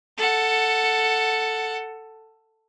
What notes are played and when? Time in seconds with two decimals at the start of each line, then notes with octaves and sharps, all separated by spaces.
0.17 A4 F#5